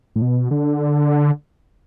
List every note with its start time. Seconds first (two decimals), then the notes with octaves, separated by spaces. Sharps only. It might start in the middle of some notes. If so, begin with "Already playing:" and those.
0.16 A2
0.22 B2
0.51 D3